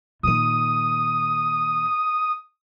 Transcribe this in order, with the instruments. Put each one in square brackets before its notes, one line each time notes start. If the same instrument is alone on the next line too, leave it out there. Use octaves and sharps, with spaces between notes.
[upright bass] A#2 D#3 [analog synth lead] D#6